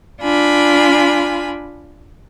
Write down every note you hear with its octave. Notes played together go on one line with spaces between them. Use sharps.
D4 F4 G#5 B5